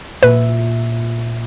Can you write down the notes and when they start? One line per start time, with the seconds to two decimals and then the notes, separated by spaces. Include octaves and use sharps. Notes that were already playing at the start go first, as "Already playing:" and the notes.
0.23 A#2 B4 E5